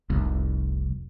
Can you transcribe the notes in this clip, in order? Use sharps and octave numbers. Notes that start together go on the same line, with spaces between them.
F1 C2